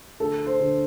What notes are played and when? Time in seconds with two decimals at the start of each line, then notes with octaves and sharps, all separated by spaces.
0.20 D2 A4
0.46 C5
0.60 D3